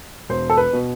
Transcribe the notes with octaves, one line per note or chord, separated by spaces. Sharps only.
E1 C5
A4
B4
B2